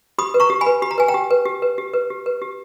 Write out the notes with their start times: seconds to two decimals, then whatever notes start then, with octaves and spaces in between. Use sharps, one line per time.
0.18 G4 B5 D#6
0.34 B4
0.40 A#5 C#6
0.50 G4
0.61 G#5 B5
0.66 B4
0.82 G4 B5
0.91 A#5
0.98 B4 G#5
1.08 G5 A#5
1.14 G4
1.30 B4
1.45 G4
1.62 B4
1.78 G4
1.93 B4
2.10 G4
2.26 B4
2.42 G4